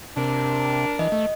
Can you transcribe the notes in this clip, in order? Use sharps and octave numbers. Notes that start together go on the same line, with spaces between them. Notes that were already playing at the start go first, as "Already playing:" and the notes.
C3 D4 A#4
E3 D#5
A3